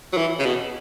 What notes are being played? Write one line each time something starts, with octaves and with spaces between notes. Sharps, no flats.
F#3
E3
C#3
B2